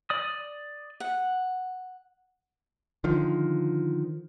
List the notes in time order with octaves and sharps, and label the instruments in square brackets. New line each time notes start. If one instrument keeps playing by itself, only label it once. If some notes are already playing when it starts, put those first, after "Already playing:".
[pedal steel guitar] D5 D#6
[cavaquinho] F#5
[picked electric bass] D3 D#3 F3